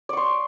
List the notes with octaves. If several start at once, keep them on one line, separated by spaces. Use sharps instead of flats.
D5 C6 C#6